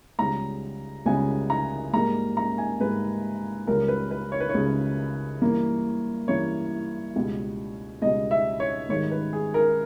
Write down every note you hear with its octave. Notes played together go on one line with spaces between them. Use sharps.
C#2 C#3 G3 B3 A#5
C#2 C#3 G3 B3 G#5
A#5
G#2 G3 A#3 A#5
A#5
G#5
G#2 G3 A#3 B4
C#2 C#3 G3 A#4
B4
B4
C#5
B4
C#5
C#2 C#3 G3
G2 E3 A#3
G2 E3 A#3 C#5
C#2 B2 G3 B3
C#2 B2 G3 B3 D#5
E5
C#5
G#2 D#3 G3 C#5
B4
G#4
A#4